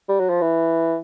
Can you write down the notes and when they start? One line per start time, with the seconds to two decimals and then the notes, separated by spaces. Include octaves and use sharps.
0.09 G3
0.20 F#3
0.29 F3
0.41 E3